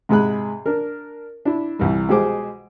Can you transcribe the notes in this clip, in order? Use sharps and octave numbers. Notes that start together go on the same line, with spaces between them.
G#2 C3 G#3 G#4 B5 F#6
D4 A#4
D4 E4
C2 E3 G3
B2 G#3 G4 G#4 C5 D6